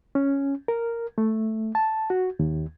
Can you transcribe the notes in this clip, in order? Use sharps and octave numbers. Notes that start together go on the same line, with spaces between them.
C#4
A#4
A3
A5
F#4
D#2